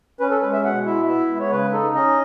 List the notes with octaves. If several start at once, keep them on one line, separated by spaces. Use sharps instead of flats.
C#4 B4
A4
G#3 B4
E5
B2 F#5
E4 E5
B3 E5
G#3
C#5
C#3 B4
D#4 A4
C#4 D#5